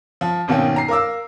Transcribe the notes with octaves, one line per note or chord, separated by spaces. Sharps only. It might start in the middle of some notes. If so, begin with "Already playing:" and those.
F3
G#1 B2 D#3 A#3 C#4 G5
A#5 C7
A#4 F5 D6 E6